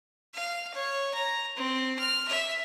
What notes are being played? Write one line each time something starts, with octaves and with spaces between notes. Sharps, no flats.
F5
C#5
A#5
C4
F6
E5